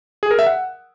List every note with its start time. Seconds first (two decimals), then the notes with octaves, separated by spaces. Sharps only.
0.23 G#4
0.31 A#4
0.39 E5
0.47 F#5